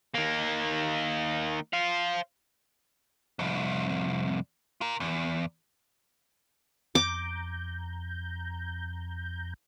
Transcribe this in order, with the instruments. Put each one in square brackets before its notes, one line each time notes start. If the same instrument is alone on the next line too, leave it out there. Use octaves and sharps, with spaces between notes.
[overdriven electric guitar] D#3 A#3
C5 F5
[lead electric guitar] C2 F2
F4 A#4
E2
[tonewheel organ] F2 A#5 G6 [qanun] D6